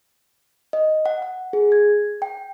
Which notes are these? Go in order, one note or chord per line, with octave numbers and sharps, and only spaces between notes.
D#5
F#5
F#5
G#4
G#6
G5